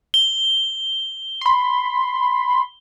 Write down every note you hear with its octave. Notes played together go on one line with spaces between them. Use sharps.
G7
B5 C6